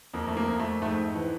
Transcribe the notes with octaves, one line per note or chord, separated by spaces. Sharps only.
F2 A#3
A3
A#3
F2
A3
G#2 A3
E3